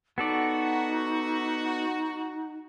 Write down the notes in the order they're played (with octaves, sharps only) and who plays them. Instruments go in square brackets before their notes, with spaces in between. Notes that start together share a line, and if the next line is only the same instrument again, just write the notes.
[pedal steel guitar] B3 A4 D5 [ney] D#4 [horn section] F#4